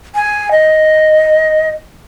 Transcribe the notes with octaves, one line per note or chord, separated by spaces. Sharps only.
G#5
D#5